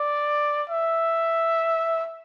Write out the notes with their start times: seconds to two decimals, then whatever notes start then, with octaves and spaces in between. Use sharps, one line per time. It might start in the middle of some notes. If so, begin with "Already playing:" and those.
Already playing: D5
0.70 E5